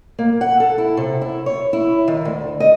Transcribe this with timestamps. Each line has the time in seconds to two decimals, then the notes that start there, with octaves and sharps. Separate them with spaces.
0.19 A#3
0.41 F#5
0.60 A4
0.78 E4
0.97 C3
1.21 E4
1.46 C#5
1.73 E4
2.08 D#3
2.25 D2
2.60 D#5